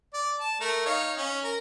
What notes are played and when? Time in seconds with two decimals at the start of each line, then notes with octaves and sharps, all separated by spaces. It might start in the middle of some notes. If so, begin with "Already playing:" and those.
0.14 D5
0.40 A5
0.61 A3 A#4
0.86 D#4 C#5 F5
1.17 C#4
1.44 A#4